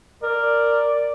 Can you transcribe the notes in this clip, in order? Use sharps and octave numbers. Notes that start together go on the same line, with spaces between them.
A#4 D5